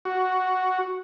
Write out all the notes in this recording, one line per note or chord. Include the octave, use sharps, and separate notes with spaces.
F#4